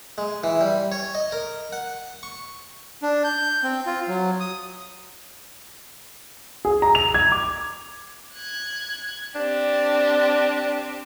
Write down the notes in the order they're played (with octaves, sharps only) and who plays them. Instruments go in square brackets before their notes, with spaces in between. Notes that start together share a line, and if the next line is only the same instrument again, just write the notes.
[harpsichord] G#3
E3
G3
C#5
D#5
A#4
F#5
C#6
[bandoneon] D4
G6
C4
F4
F#3
D#6
[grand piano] G#4
A#5
F7
G#6
D6
[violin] F#6 G#6
[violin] C4 G4 [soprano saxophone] D4